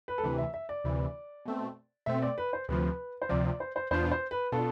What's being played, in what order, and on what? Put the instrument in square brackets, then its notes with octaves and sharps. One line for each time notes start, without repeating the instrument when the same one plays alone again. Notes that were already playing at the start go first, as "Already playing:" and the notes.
[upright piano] B4
A4
[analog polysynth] D2 C3 E3 [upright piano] B4
[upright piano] E5
E5
D5
[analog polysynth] D2 C3 E3
B2 A3 C4
[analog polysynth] B2 A3 C4 [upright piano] E5
[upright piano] D5
B4
C5
[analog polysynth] D2 C3 F3 [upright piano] B4
[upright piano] C5
[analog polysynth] D2 C3 F3 [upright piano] D5
[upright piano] D5
C5
C5
[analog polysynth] E2 B2 B3 D4 F4 [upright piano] C5
[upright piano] C5
B4
[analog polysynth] B2 B3 D4 F4 [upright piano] A4